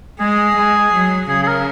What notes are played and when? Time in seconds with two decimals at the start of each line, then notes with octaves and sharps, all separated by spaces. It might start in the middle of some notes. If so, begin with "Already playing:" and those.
0.20 G#3 G#4
0.56 G#3
0.93 F#3
1.28 C#3 G#4
1.43 G#4
1.47 A#4